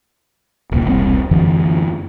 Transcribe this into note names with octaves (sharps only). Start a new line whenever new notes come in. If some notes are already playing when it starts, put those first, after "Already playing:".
D#1 C2 A#2
E1 C2 G3 C4
F#2 D3 E3